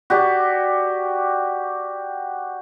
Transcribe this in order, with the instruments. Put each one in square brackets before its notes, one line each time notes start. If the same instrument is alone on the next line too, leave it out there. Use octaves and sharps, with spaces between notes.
[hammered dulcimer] F#4 G4 D5